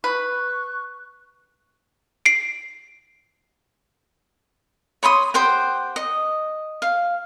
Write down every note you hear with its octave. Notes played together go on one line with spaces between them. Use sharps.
B4 C#6 F#6
C7 D7
C#5 B5 C6 D#6
G4 C5 F#5 G5
D#5
F5